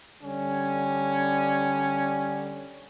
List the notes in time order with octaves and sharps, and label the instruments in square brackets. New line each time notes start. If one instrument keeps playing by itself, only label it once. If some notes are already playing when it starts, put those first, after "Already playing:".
[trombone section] D3 G3 C#4